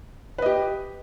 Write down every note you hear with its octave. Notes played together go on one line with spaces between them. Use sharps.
G4 B4 D#5